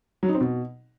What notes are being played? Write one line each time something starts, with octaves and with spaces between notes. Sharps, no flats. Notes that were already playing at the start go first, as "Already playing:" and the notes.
F#3
D#4
C4
B2